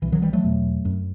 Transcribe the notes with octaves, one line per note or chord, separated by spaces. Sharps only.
C2 B2 E3
D#3 F#3
E3 G3
F#3 A3
E2 B2
F#2